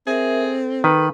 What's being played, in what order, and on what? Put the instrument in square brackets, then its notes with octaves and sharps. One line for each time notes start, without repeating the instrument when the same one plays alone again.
[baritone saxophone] C4 [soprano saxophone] G#4 [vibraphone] A#4 E5
[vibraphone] A4
[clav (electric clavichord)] D#3 [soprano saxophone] B4